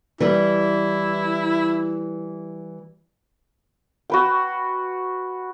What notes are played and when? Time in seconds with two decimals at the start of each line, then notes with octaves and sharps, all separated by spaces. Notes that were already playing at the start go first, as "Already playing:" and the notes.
0.20 E3 G3 E4
4.10 F#4 B4 G5